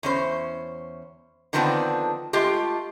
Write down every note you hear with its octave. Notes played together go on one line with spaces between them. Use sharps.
E2 C#4 C5
D3 D#3 F3 B3 C4 D4
G#3 A3 F4 G4